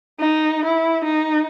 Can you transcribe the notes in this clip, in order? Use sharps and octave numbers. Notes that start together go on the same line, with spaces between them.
D#4
E4
D#4